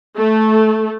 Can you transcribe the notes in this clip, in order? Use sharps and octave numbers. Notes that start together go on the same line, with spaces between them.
A3